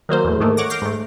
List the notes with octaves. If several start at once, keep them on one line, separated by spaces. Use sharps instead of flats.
D#3 F#3 A#3 C5
E2 A2
G#2 D#3 A3 A#3
C#5 F#5 D6 A#6
F5 D6 G6 A#6 C7
G#2 A3